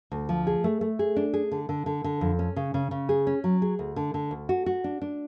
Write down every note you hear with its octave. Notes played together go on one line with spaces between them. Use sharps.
D2
F3
G#4
A3
A3
G#4
D4
G#4
D3
D3
D3
D3
F2
C#4
C#3
C#3
C#3
G#4
C#4
F#3
G#4
D2
D3
D3
D2
F#4
F#4
D4
D4